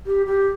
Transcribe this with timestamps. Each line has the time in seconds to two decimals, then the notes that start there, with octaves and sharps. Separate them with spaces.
0.06 G4
0.26 G4